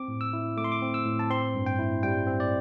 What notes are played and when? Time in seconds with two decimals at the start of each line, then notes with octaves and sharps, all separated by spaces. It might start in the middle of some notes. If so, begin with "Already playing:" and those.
Already playing: C4 D6
0.08 A2
0.21 E6
0.33 E4
0.57 A3 D6
0.64 C6
0.72 D6
0.82 C4
0.94 E6
1.06 A2
1.19 A5
1.30 C4 C6
1.55 G2
1.66 G5
1.79 E4
2.03 G3 G5
2.27 C4
2.40 D5